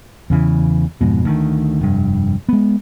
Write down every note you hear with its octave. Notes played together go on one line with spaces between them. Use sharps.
E2 C#3 E3
F2 G#2 B2
D2 D#3
F1 G2
G#3 B3